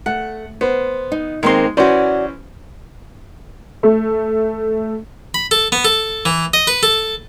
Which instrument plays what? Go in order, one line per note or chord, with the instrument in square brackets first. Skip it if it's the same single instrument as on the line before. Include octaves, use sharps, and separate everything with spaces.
[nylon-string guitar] A3 [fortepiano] F#5
[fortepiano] B3 [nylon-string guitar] C5
[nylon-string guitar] D#4
[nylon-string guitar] D#3 A#3 C4 [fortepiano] G#3 C6
[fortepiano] E3 C#4 C5 [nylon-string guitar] F#4 D5
[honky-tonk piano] A3
[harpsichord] B5
A4
B3
A4
E3
D#5
B4
A4